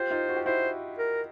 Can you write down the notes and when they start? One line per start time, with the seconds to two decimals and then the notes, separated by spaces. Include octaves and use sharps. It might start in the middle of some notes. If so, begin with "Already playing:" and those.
Already playing: F4 G4 C5
0.11 D#4 F4
0.29 F#4
0.36 G4
0.45 E4 F#4 C5
0.99 A#4